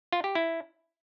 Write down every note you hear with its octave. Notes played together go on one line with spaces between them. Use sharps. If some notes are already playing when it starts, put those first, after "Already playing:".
F4
G4
E4